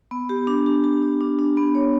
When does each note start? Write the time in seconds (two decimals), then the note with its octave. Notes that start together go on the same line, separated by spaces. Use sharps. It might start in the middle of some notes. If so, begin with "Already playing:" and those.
0.11 B3
0.29 G4
0.47 D4
0.66 G4
0.84 G4
1.02 D4
1.21 D4
1.39 D4
1.57 B3
1.75 C#5